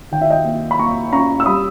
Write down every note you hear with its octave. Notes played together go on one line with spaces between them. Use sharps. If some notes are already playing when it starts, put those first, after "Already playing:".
D#3 G5
E5
D#5 G5
A#3
B5
A#3 A#5 C#6
C#4 A#5 C#6
E6
G3 B5 D#6